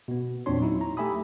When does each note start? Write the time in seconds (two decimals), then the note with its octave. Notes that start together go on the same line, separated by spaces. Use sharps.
0.08 B2 B3
0.46 E2 A#2 C4 D4 C#5 C6
0.60 F#3 D#4 E4
0.81 A#5
0.97 A3 G4 E5 G#5 B5 D#6